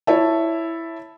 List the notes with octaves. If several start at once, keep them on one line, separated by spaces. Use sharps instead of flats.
E4 C#5 E5 A5